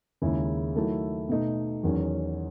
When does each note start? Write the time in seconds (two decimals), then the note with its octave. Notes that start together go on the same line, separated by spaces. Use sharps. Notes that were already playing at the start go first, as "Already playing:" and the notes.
0.22 D#2 C#3 G#3 C#4 E4
0.75 D#3 F#3 A3 E4
1.29 B2 A3 D#4
1.83 E2 D#3 F#3 C#4